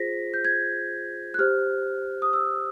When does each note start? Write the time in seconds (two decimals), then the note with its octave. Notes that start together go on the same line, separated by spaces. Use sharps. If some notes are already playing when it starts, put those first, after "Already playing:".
Already playing: F4 G#4 C5 A#6 B6
0.34 G6
0.45 G#6
1.34 F#6
1.39 G4 C5 F6
2.22 D#6
2.33 E6